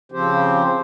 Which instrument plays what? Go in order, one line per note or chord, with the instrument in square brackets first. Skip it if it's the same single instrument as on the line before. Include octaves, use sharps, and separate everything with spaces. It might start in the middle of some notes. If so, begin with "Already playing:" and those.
[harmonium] C#3 F3 C4 G4 C5